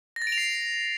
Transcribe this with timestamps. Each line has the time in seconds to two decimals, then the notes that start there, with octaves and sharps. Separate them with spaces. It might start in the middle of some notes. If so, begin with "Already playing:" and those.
0.16 A#6
0.22 A6
0.27 D7
0.32 F7
0.38 C7